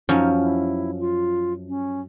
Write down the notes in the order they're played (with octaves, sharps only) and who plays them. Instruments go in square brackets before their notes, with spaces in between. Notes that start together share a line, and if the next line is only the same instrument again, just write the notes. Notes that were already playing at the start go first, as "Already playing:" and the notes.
[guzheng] F#2 F3 C#4 [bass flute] D#4
[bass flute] E4
F4
C#4